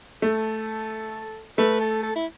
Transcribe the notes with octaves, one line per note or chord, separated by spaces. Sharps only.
A3 A4
A3 B4
A4
A4
E4